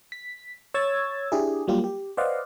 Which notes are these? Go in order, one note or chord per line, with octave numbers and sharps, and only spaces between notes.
B6
C#5 E6 G#6 A6
D4 E4 G4 G#4
F#3 G3 A#3 F4 G4
G4
B4 C5 D5 D#5 F5 F#5